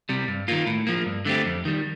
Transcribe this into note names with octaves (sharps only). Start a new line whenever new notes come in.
C3 G3
G2
D#3 A#3 F4
A2
F3 A#3
G2
D3 A3 C4 G4
F2
D#3 G3